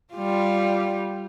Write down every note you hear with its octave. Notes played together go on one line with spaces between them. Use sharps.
G3 F4